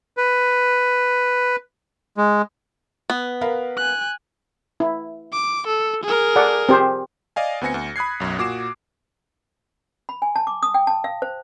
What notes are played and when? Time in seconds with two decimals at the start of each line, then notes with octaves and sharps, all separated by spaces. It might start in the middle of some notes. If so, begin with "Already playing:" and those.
0.17 B4
2.17 G#3
3.10 B3
3.41 A#4 B4 F5
3.77 G#5 F#6
4.80 E4
5.33 D6
5.68 A4
6.04 G#4 A#4
6.36 A4 D5 F#5
6.69 C4 G4 C5
7.36 D5 D#5 F5 G#5
7.61 D2 B3 C4 G#5 A#6 C#7
7.74 D2
7.96 B5 D#6 F#6 G#6 C7
8.20 B1 F#2
8.38 A#2 F#4 D6 C7 E7
10.09 B5
10.22 G#5
10.36 A5
10.47 D6
10.63 D#6
10.74 G5
10.87 A5
11.04 F5
11.22 C5